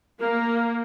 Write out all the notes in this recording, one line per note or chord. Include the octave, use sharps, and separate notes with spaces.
A#3 A#4